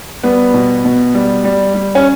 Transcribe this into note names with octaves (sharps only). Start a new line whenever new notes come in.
G3 B3
B2
B2
G3
G3
G3
C#4